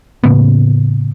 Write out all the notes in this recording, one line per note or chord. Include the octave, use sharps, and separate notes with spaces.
A2 C#3 A#3 B3